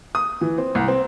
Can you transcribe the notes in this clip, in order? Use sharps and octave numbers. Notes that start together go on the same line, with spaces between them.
D#6
E3
C4
C2
C4